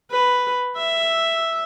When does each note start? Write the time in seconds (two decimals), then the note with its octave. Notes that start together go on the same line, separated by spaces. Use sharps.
0.11 B4
0.77 E5